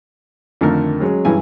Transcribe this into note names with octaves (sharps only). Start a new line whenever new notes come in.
F2 D3 D#3 A3 A#4
F#3 G#3 C#4
G2 E3 G#5